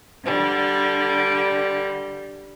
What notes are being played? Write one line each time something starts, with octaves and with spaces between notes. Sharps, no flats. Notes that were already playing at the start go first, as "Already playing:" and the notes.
D3 G3